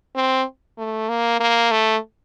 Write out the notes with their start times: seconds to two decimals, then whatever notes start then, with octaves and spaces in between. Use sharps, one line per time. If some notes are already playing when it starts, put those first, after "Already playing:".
0.16 C4
0.78 A3
1.09 A#3
1.40 A#3
1.71 A3